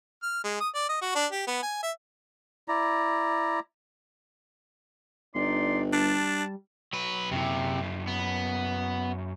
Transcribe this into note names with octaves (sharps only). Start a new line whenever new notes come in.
F6
G#3
D#6
D5
D#5
F#4
D4
G4
B3
G#5
E5
E4 D5 A#5
G1 D#4 D5 C6
G3 D4 A5
F#3 B4
F#2 C3 E4
B3